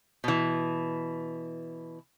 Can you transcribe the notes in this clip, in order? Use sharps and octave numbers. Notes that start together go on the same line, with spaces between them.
B2 E3